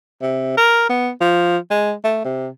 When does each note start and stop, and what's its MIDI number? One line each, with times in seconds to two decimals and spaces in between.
0.22 0.52 48
0.57 0.86 70
0.89 1.11 59
1.20 1.58 53
1.70 1.93 56
2.04 2.21 57
2.24 2.48 48